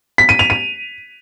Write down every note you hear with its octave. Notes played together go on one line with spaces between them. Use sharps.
B6
D#7
F7
D#7